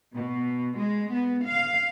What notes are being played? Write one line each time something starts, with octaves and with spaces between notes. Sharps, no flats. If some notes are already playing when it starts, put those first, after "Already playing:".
B2
G#3
B3
F5